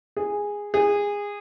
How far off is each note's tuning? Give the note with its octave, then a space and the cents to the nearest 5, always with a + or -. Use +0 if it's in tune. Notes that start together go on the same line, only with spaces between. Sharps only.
G#4 -10
G#4 -20